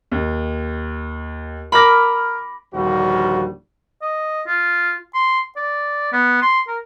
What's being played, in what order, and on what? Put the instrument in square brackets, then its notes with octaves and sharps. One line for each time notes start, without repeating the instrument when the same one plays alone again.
[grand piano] D#2
[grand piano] A#4 F6 A#6 [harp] B5 D6
[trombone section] A#1 D#2 D3 F3 G3 F#4
[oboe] D#5
F4
C6
D5
B3
C6
A#4